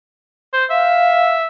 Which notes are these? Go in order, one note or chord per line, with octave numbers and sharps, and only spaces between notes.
C5
E5 F5